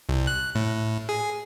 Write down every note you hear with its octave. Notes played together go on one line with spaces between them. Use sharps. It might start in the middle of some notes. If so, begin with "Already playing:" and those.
C2
F#6
A2
G#4